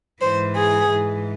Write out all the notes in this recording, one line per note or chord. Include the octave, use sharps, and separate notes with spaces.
G#2 E3 C5
G#4
G#2 E3